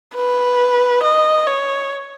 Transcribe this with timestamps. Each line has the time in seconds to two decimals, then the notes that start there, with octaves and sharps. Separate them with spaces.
0.16 B4
1.03 D#5
1.47 C#5